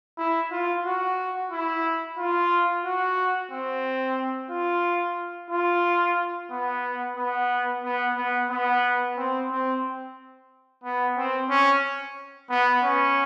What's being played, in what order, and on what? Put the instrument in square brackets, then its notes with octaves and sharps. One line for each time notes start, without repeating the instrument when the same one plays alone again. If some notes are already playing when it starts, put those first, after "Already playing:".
[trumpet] E4
F4
F#4
E4
F4
F#4
C4
F4
F4
B3
B3
B3
B3
B3
C4
C4
B3
C4
C#4
B3
C#4